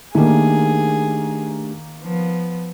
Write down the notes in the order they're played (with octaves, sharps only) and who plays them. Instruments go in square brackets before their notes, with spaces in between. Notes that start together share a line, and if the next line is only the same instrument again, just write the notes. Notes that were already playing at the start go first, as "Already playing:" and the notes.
[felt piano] D#3 A#3 [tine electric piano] A3 D4 G4 [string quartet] G#4
[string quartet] F3 B3